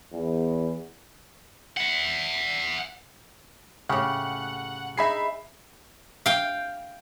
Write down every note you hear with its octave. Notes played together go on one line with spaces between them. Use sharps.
E2
E5 F#5
A2 C#3 G4 F#5
D#4 G#4 E5 B5 C7
F5 G5